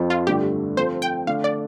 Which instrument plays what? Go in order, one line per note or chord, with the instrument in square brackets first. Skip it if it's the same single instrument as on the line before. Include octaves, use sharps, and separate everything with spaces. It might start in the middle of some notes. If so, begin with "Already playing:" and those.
Already playing: [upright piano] F2 F3 C4
[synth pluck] F4
[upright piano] G2 D3 A3 [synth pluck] G4
[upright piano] F3 C4 F4 A4 [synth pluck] C5
[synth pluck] G5
[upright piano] D3 A3 D4 [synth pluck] F5
[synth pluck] D5